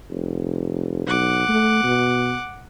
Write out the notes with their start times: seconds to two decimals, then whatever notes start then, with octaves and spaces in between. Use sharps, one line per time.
0.10 F1
1.07 B1 F#5 D6
1.49 A3
1.83 B2